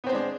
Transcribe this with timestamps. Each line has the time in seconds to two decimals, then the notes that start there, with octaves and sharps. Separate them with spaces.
0.04 B3
0.06 C4
0.09 C5
0.12 G#3
0.15 D4